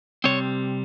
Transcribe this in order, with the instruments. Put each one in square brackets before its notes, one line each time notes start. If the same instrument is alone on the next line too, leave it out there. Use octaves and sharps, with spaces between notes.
[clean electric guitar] C3 G3 C4 C#5